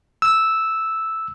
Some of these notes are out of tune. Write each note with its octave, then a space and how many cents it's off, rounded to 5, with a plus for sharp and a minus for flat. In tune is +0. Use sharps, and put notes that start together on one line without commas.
E6 -5